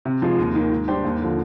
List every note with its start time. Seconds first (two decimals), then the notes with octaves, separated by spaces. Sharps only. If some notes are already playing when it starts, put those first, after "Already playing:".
0.05 C3
0.22 F3 G#3
0.39 D#2
0.55 D#3 A#3
0.71 G#2
0.88 G3 D4 G4 C5
1.05 D#2
1.21 D3 F3